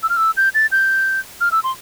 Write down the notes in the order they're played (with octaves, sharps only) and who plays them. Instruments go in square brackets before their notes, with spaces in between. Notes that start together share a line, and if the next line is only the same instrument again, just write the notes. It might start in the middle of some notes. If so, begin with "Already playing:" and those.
[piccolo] E6
F6
E6
G6
A6
G6
F6
E6
C6